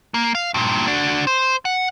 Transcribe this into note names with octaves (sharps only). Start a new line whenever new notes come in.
A#3
F5
G2 A#2
D4 F#4
C5
F#5